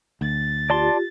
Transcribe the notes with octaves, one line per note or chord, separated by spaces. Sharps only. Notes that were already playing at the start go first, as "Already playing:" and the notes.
D2 A6
F4 G4 D5 A5 C6